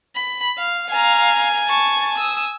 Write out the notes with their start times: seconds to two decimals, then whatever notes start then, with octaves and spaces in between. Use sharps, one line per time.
0.16 B5
0.58 F5
0.90 F5 G#5 A#5
1.67 A5 C#6
2.18 D#6 E6